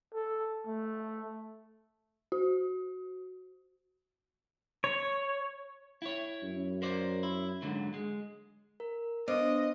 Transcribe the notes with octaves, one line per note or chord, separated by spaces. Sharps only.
A4
A3
F#4
C#5
E4 C#5
F#2
A#4 C5 D5
E4
G#2 D3 F#3
G#3
A#4
B3 D4 C5 D#5